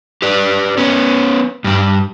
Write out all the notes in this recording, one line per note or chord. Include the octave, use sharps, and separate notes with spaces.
G4 B4 D5
B3 C#4
G2 G3